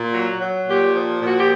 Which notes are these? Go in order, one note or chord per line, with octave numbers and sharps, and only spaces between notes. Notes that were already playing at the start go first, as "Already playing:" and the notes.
Already playing: A#2
F#3
F#3
A#2 G4
F3
A#2 F#4
G4